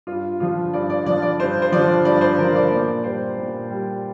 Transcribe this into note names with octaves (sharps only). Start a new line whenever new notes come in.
G2 F4
D3 F3 F4
G2 D5
D5
D3 F3 D5
D5
G2 C5
C5
D3 F3 D5
G2 D5
C5
D3 F3 A#4
D5
A#2 D5
G3 C5
A#2
G3